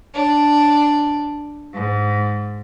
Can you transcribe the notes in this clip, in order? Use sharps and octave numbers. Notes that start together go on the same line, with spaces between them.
D4
G#2